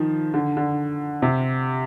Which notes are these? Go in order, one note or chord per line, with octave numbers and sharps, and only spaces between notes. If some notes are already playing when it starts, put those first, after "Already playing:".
Already playing: D#3 F3
D3
D3
C3